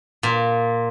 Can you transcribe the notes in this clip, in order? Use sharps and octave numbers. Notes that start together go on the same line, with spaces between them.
A#2